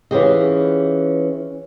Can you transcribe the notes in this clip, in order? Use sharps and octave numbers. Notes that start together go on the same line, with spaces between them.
E3 C#4 F4 G4 G#4 D#5